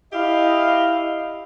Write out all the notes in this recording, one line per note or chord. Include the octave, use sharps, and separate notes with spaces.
E4 G4 D#5 F5